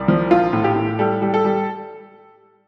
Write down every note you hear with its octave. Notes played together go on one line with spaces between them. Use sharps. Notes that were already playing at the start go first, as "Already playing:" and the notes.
Already playing: C2 D5
F3
A#1 F4
A2
G4
A2
G3 A4
G3
A4
G3